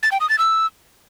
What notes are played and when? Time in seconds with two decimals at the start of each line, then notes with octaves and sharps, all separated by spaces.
0.03 A6
0.12 G5
0.21 D#6
0.30 A6
0.39 E6